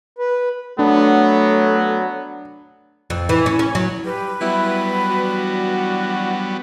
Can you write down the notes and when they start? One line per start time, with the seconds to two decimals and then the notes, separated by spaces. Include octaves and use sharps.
0.19 B4
0.79 F#3 A3 B3 D4
3.10 F2
3.29 E3
3.46 C#4
3.59 C#4
3.75 F#3
4.05 G3 G4 B4
4.41 F#3 G3 B3 E4
5.10 E3 D4 F#4